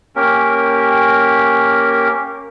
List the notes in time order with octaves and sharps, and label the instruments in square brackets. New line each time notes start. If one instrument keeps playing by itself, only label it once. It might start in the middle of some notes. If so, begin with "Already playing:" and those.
[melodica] A#3 C#4 G4 A#4